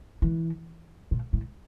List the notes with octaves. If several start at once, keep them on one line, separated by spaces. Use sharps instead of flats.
E3
A#2
A2